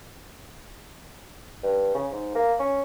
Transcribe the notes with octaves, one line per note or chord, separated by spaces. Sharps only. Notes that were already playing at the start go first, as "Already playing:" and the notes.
G2
C#3
G#2
A#3
C#4